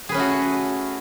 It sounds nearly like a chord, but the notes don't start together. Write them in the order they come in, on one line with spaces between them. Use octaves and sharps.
G#4 B4 C#4 A3 F#4